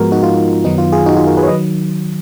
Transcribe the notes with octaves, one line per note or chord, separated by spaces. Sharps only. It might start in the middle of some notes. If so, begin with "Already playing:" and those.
Already playing: G#2 F3 G#3 B3 F#4 A#4
D#4 F#4
F4
F#2 D#3 F#3 B3 D#4
F4
F4 G#4
D#4 F#4
F4 G#4
F#4 A#4
G#4 B4
C#5
D#3 F#3 B4 D#5